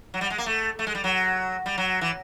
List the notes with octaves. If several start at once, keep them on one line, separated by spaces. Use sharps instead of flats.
F#3
G3
G#3
A#3
A3
A3
G#3
G3
F#3
G3
F#3
E3